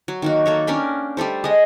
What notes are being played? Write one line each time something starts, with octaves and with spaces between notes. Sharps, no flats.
F#3
D#3 A#3 F#4
A#3 A4 C#5
C#4 D4 A#4 G5
G3 A3 A4 C5
G#3 D#5